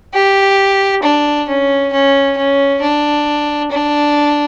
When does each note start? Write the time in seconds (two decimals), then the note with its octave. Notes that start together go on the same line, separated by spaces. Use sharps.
0.14 G4
1.02 D4
1.48 C#4
1.92 C#4
2.37 C#4
2.81 D4
3.71 D4